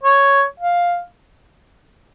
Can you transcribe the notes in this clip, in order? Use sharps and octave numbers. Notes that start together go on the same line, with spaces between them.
C#5
F5